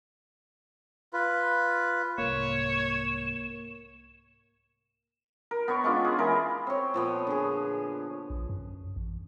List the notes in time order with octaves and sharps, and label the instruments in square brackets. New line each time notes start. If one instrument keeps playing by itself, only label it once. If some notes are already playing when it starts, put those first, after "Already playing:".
[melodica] F4 B4
[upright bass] C2 G#2 [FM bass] A#3 [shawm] C#5 [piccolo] E7
[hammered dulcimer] A#4
B3 C#5 C#6
G#3 C#4 D4 F4
G#4
E3 G#3 A#4
C4 C#5
A#2 F3 B3
D3 G#4
[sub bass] A#1
F#2
A1